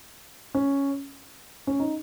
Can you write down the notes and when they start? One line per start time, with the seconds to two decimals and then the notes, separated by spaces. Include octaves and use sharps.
0.54 C#4
1.67 C#4
1.79 D#4